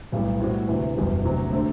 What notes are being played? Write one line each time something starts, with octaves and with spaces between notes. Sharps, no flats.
B1 A2 G3 B3
A2 G3 C4 F#4
D2 C3 E3
F#1 E2 B2 G3
D2 C3 F#3
D3 A3 C4